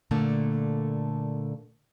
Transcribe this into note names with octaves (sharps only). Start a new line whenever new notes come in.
A#2 D3 A3 A#3